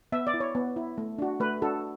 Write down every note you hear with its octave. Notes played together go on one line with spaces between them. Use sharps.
B3 E5
D5
E4
C#5
B3
E4
A3
D4 F#4
A3 B4
D4 F#4 A4